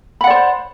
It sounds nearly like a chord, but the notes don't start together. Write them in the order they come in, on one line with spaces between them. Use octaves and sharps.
B5 F#5 D5 C5